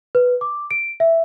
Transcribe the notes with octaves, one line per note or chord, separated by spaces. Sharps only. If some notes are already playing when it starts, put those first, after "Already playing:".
B4
D6
D7
E5